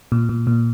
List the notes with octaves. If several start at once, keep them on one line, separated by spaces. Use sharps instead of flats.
A#2
A#2
A#2